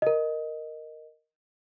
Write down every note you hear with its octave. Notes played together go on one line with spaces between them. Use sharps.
A#4 D#5